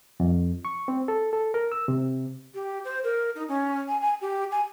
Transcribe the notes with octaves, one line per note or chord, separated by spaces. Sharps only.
F2
C#6
C4
A4
A4
A#4
E6
C3
G4
C5
A#4
D#4
C#4
G#5
G#5
G4
G#5